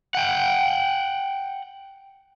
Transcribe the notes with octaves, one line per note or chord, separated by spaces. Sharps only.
F#5 G5